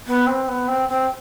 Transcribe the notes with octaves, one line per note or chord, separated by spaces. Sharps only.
B3
C4
B3
C4
C4